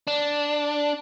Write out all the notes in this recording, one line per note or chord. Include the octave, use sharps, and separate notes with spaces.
D4